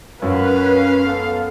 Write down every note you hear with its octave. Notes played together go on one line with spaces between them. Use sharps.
F#2 C#4 B4 F5
B3 A4